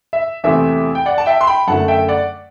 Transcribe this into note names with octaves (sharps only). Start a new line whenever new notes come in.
E5
E2 C3 E3 A3 C4 E5
G5
D5 F#5
A5
E5 G5
C6
G5 B5
F#2 D3 A3 F#5 A5
E5 G5
D5 F#5